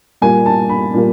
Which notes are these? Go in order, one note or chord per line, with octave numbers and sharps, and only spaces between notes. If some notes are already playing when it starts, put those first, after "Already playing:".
A#2 G3 A#3 G#5
A5
B5
A#2 G3 A#3